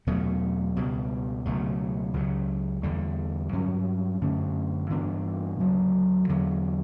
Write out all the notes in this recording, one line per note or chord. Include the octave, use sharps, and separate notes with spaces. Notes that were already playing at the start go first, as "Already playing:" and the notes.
E2 B2 F#3 A3
C#2 B2 G3
C#2 B2 F#3 A3
C#2 C#3 F#3
E2 D3 G3
G2 F#3 C#4
F#2 D3 A3 C#4
G2 E3 B3 D4
D2 C#3 F#3
E2 D3 F#3